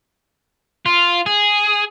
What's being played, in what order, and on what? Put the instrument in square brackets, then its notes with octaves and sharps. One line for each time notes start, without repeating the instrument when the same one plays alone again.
[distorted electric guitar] F4
G#4